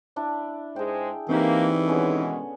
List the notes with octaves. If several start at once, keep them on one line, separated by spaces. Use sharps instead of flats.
D4 E4 F#5
G#2 G#3 G#4 C5 G5
D3 E3 A#3 C4 D#4 F#4 G4
B2 D3 D#3 G#3 B3 C#4